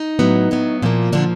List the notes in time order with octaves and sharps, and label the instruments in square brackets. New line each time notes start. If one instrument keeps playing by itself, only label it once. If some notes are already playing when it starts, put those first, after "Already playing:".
Already playing: [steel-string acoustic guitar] D#4
A2 F#3 B3
A2 F#3 B3
A#2 F3 A#3
A#2 D3 F3 A#3 D4